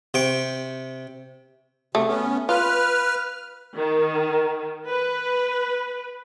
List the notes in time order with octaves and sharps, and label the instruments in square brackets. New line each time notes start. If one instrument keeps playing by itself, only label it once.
[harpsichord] C3 G5 C#6
[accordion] C3 [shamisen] A3
[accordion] B3 C#4
[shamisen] F4 [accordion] B4 F6
[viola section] D#3
B4